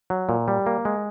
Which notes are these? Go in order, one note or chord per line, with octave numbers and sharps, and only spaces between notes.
F#3
A#2
G3
A#3
G#3